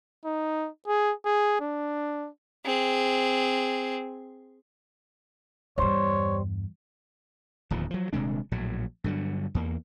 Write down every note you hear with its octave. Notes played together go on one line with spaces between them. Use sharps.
D#4
G#4
G#4
D4
C4 G#4
E2 G2 G3 C5 C#5
D1 D#2 F3
F3 F#3
D#1 C3 G#3 D4
A#1 A2 F#3
G2 D3 F#3
E2 A#3